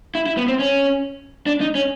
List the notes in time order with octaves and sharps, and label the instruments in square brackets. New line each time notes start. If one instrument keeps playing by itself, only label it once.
[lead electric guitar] E4
E4
B3
C4
C#4
D4
D#4
C#4